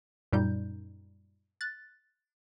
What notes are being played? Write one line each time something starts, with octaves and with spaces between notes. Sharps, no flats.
F#2 A#2 G3 D#4 G6
F#6 A6